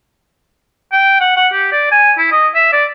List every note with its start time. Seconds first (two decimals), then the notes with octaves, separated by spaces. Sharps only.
0.93 G5
1.20 F#5
1.36 F#5
1.53 G4
1.72 D5
1.92 G#5
2.19 E4
2.32 D#5
2.55 E5
2.73 D5